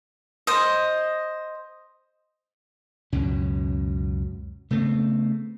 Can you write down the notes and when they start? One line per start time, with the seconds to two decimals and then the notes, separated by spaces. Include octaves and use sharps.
0.47 C5 D#5
3.12 C#2 F#2 B2 C#4
4.70 C#3 A3 B3 C4